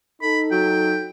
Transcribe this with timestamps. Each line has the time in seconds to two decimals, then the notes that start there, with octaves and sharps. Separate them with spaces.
0.21 D#4 A4 B5
0.52 F#3 G5